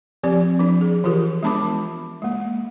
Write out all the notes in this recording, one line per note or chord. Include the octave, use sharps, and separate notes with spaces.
F3 C4 G4 D5
F3 D4
G#4
E3 F4 G4 A#4
G#3 B3 D4 A5 B5 D6
G#3 A#3